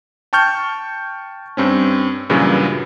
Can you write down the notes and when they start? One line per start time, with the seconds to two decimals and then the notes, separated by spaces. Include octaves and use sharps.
0.33 G5 A5 C#6 F6 G6
1.57 G2 C4 C#4
2.30 G2 A#2 C#3 E3 F#3